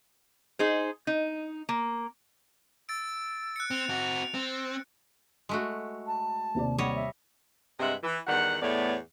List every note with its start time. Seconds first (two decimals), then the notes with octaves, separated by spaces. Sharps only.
0.59 D#4 G#4 C5
1.07 D#4
1.69 A#3
2.89 E6 A6 D7
3.56 F#6 C#7
3.71 C4 F7
3.89 C4 F#4
4.34 C4
5.49 G#3 A3 F#4
6.06 A5
6.55 D#2 C3 D5
6.78 G3 C#5 D#5 F#5
6.95 E5
7.80 G2 C3 G#3 D#5 E5 F#5
8.03 E3
8.27 E2 D#3 G3 F#5
8.62 E2 A2 A3 B3 C#5 D5